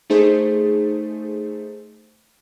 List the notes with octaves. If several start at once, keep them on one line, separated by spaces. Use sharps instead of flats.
A3 D#4 G#4 C5